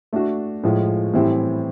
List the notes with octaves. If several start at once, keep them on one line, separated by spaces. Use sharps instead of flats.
A3 D4 F#4
A2 F3 G#3
A2 E3 G3 C4 E4